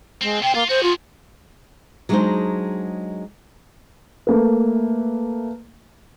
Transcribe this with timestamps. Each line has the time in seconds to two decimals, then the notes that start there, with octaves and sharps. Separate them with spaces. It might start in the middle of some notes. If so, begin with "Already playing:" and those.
0.21 G#3 C4
0.43 C3 C5 G5
0.55 A#3 F4
0.69 F#4 G#4 C5
0.83 F4
2.09 F#3 G#3 D4 D#4 G#4 C5
4.27 A3 A#3 B4